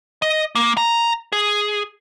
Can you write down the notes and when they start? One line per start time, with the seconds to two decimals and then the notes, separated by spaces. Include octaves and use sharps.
0.22 D#5
0.55 A#3
0.77 A#5
1.32 G#4